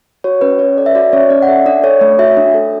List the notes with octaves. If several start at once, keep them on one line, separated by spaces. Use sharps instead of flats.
F#4 C#5
C#4 B4
C#4 C#5
A4 D5
E5
F#4 D5
C#4 C#5
C#4 D5
F#5
A4 E5
D4 D5
A4 C#5
A3 C#5
F#4 E5
D4
A4